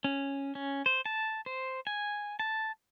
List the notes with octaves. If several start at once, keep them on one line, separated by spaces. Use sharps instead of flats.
C#4
C#4
C5
A5
C5
G#5
A5